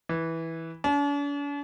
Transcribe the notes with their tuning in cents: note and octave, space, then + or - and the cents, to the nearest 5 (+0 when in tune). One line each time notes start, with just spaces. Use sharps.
E3 -10
D4 -45